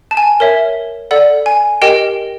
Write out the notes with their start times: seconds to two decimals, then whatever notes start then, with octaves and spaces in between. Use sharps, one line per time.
0.11 A5
0.17 G#5
0.40 A#4 C#5 E5
1.11 A4 D5 F#5
1.46 G#5
1.82 G4 A#4 D#5 G5